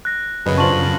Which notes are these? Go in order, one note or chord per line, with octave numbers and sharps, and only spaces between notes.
F#6 A#6
F#2 C#3 B4 D#5
D4 F4 C5 C#6 F#7